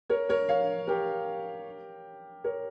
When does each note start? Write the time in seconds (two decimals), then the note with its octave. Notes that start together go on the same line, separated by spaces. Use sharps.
0.10 A#4 C#5
0.29 A#4 C#5
0.49 C#5 F5
0.87 G4 A#4
2.44 A#4 C#5